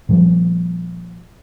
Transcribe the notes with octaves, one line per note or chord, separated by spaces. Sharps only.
A#2 F3 G3